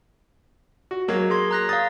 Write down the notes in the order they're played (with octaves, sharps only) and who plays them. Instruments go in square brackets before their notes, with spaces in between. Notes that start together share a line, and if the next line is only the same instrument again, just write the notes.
[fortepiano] F#4
F#3 G#3 A#3
[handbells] G#4 C6 G#6
A#5 F#6 A#6
[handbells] F5 A6 [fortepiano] D#6